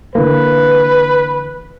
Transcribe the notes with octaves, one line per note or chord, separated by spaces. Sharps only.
D3 E3 A#3 B4